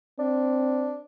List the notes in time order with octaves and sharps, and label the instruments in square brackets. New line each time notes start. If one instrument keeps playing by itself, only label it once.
[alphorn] C4 [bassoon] D4